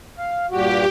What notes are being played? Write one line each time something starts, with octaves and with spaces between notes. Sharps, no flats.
F5
G2 A#2 F#4 G4